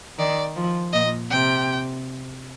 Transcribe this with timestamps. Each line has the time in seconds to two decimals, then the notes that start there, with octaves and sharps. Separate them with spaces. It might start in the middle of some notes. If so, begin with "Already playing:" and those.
0.18 D#3 D5
0.56 F3
0.93 A#2 D#5
1.31 C3 G5